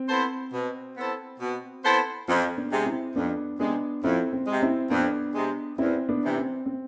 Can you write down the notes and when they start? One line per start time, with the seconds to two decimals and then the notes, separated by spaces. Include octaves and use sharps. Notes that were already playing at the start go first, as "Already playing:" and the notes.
Already playing: C4
0.09 B3 E4 A4 C5
0.53 B2
0.96 B3 E4 A4 C5
1.40 B2
1.84 B3 E4 A4 C5
2.28 F2 C4
2.57 B3 D4
2.71 C3 G#3
2.86 C4 E4
3.15 F2 B3 D4
3.59 C3 G#3 B3 D4
4.03 F2 C4 E4
4.33 C4
4.47 C3 G#3
4.62 C4 E4
4.91 F2 B3 D4
5.35 C3 G#3
5.78 E2 C4 E4
6.09 B3 D4
6.23 C3 E3
6.38 C4
6.66 C4